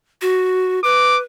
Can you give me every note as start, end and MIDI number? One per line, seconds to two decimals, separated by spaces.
0.22 0.80 66
0.84 1.22 71
0.84 1.18 86